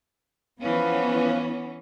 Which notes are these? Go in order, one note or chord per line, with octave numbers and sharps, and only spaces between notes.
E3 F3 B3 C#4 B4 F5